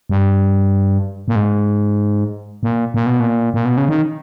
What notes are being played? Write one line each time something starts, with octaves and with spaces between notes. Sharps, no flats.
G2
A#2
G#2
A#2
A#2
B2
A#2
A#2
B2
C#3
D#3